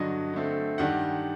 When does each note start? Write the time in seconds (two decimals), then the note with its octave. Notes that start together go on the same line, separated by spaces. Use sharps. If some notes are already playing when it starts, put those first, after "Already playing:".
Already playing: G2 D3 F#3 D#5
0.33 D3 A3 C4
0.78 G2 D#3 G3 F#5